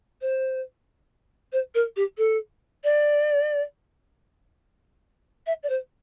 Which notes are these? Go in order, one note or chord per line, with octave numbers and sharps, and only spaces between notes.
C5
C5
A#4
G4
A4
D5
E5
D5
C5